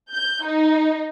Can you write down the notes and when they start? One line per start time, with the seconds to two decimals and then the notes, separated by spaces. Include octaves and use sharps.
0.13 G6
0.43 D#4